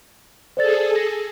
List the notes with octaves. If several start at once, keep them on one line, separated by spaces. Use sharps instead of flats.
G#4 A4 C5 D5 A6
A#6